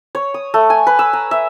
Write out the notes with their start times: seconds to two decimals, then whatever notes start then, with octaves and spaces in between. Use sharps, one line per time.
0.15 C#5
0.34 D#6
0.54 A3
0.70 G#5
0.87 B4
0.99 E6
1.13 A#5
1.31 E5